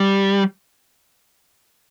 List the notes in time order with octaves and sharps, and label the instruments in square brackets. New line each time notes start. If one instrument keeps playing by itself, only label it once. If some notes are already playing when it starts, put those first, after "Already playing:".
Already playing: [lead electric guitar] G3